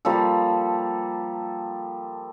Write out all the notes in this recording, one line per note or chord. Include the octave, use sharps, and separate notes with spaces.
F3 G3 A#3 A4